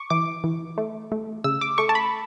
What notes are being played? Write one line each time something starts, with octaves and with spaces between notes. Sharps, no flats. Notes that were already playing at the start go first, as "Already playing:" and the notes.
Already playing: C#6 D6
E3 D6
E3
A3
A3
C#3 E6
D6
A3 C#6
A5
B5